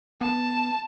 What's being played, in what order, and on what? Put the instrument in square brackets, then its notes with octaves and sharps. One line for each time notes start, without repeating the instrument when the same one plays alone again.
[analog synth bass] B3 [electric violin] A5